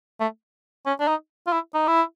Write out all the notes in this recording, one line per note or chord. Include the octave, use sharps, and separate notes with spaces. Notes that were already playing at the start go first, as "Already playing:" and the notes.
A3
C#4
D4
D#4
F4
E4
D#4
E4